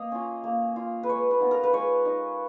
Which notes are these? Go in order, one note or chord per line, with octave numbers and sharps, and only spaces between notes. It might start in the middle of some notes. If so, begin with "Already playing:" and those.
Already playing: A#3 D#5
C#4 F4
A#3
F4
B4
G#3 C#5
B4
B3 D#4
A#4
B4
G#3 C#5
D#4